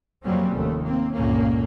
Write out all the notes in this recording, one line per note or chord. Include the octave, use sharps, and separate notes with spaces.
F2 F#3 G3 A#3 C4 C#4
F1 D#2 A3
A#3 C4
G1 C#2 A#2 A#3 C#4